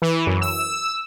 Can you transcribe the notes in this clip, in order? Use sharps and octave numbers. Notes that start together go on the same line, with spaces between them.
E3
F#2
E6